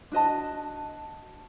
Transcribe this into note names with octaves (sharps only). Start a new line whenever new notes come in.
D4 F#4 D#5 A5